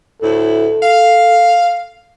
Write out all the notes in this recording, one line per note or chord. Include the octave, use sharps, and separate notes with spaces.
D2 A2 E4 A4
F5